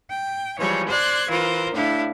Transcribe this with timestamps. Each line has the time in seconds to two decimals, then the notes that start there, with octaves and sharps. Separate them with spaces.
0.10 G5
0.59 E3 F3 G3 G#3 C#5
0.88 C5 D5 C6 F#6 G#6
1.29 E3 F4 A#4 C5
1.74 A2 D4 E4 F5